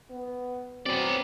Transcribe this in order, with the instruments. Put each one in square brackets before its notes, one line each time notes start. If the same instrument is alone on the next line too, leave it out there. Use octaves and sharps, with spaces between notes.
[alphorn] B3
[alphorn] F#3 [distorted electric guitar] B3 D5 [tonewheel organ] C4